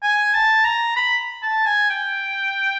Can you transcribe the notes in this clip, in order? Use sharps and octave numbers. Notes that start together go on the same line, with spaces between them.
G#5
A5
A#5
B5
A5
G#5
G5